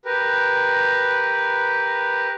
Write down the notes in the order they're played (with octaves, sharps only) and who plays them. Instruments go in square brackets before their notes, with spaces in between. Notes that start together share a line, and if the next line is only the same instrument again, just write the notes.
[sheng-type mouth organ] G4 A#4 B4